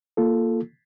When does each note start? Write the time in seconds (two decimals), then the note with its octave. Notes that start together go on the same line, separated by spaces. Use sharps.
0.17 A#3 F4 A4